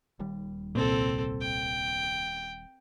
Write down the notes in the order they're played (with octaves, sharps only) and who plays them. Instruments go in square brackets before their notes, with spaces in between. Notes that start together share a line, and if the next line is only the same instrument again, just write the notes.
[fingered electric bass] D#1 D#2 G3
[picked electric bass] C2 A#2 [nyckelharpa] C4 A4
[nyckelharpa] G5